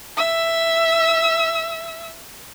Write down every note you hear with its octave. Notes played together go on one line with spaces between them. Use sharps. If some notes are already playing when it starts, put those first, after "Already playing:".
E5 E6